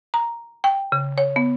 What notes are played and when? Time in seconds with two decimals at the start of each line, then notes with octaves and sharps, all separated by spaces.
0.14 A#5
0.64 G5
0.92 C#3
1.18 C#5
1.36 B3